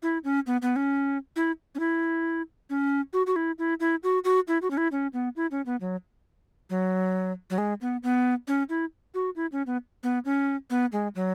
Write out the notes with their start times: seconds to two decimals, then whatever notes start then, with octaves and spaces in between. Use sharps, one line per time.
0.03 E4
0.24 C#4
0.47 B3
0.62 B3
0.76 C#4
1.36 E4
1.75 C#4
1.80 E4
2.70 C#4
3.13 F#4
3.27 F#4
3.36 E4
3.59 E4
3.80 E4
4.03 F#4
4.24 F#4
4.48 E4
4.62 F#4
4.71 C#4
4.77 E4
4.92 C#4
5.13 B3
5.36 E4
5.51 C#4
5.66 B3
5.81 F#3
6.70 F#3
7.50 F#3
7.58 G#3
7.81 B3
8.03 B3
8.48 C#4
8.69 E4
9.14 F#4
9.36 E4
9.52 C#4
9.67 B3
10.03 B3
10.25 C#4
10.70 B3
10.92 G#3
11.15 F#3